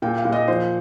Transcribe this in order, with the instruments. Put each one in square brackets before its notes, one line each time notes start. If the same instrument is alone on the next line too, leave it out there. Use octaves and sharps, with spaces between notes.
[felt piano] A#2 G5
F5
A#2
D#5
F3 C5